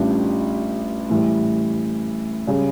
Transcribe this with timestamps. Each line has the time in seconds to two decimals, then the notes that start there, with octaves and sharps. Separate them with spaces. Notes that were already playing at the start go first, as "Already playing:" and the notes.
Already playing: A1 A2 G3 D4 F4
1.09 A2 E3 G3
2.47 C#3 G3 C#4